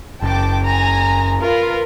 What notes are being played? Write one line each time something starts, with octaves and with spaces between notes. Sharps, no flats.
F#1 G5 A5 D6
G#5 A#5
F4 A#4 B4